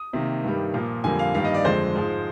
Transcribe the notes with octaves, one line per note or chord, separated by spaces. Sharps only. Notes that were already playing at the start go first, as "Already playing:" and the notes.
Already playing: D#6
C3 D#3 A#3
G2 D#3 G3
A#2 F3 A#3
F2 D3 G3 A#3 G#5
F5
G2 D#3 G3 A#3 F5
D#5
D5
F2 D3 G#3 C5
G#2 F3 G#3